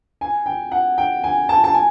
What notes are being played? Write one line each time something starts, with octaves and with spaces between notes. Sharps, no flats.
G#5
G5
F#5
G5
G#5
A5
A5
G#5